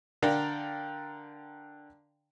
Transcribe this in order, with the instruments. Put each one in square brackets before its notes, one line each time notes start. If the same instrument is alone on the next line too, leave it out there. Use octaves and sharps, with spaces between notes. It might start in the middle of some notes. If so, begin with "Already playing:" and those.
[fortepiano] D3 A#4 D5 F5 G5 A#5